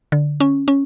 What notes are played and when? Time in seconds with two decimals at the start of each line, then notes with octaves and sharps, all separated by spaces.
0.12 D3
0.40 C#4
0.68 C#4